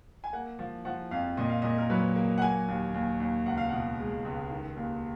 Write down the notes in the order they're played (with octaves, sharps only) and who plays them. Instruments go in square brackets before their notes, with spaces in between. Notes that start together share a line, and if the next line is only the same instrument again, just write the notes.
[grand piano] G#5
A#3 F#5
F3
F3 F#5
F2 F5
A#2 D#5
F5
A#2 D#5
A#4
F#3 B4
A#3
F#5
A#3 G#5
D#2
D#2
D#2
C#2 F#5
F5
B2 F#5
G#3
C#2
D#3
D#2